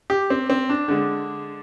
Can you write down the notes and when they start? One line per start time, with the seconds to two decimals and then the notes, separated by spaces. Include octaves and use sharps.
0.10 G4
0.30 C4
0.50 C4
0.70 D4
0.88 D3 G#3